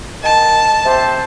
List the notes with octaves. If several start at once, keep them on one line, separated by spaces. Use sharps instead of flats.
D#3 A5
C3 C5